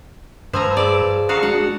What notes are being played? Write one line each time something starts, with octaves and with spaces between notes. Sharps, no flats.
G2 F3 B4 G#5 A#5 E6
G#4 D5
F#4 A4 F5 A#5 D#6
G#3 D4 F#4 F#5